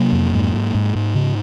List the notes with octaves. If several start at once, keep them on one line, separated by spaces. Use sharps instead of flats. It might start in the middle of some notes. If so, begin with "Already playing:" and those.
Already playing: C3 F#3 A#3
F2
G#2
G#2
G#2
G#2
C#3